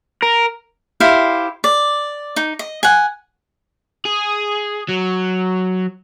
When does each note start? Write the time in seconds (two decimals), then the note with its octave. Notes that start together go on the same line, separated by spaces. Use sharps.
0.22 A#4
1.00 E4 G4 C5 F5
1.64 D5
2.36 D#4
2.59 D#5
2.83 F#5 G#5
4.05 G#4
4.89 F#3